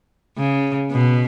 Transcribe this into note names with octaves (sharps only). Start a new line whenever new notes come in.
C#3
B2